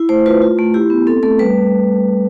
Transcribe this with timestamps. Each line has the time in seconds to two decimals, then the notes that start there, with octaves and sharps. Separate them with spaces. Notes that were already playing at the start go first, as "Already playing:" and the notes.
Already playing: E4
0.09 A3 C5
0.26 F4 B4
0.42 F4
0.59 A3
0.74 E4 G4
0.90 B3
1.07 C4 A4
1.23 A3 A4
1.39 G3 B4